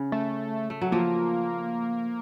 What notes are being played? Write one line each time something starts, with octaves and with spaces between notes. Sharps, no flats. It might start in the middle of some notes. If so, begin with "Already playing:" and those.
Already playing: C#3
A3
A3
F#3
F3 A#3